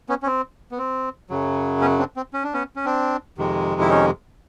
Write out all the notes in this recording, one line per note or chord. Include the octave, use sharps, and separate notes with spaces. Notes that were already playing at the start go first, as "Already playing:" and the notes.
B3 C#4
C#4
C4
B3
C4
F#2 C#3 F#3
B3 C#4
C4 D4
C4
C#4
D4
B3 C#4
C#4
C4 D4
F2 C3 D#3 G#3
E4
C#4 D#4